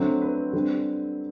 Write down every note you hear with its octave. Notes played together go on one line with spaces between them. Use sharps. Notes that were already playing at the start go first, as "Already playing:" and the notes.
Already playing: D3 F#3 A3 C4
B4
D3 G3 C4